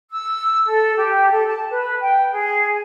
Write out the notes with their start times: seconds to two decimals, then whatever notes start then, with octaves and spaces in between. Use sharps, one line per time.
0.10 E6
0.66 A4
0.96 G4
1.31 A4
1.47 A5
1.70 B4
2.01 G5
2.32 G#4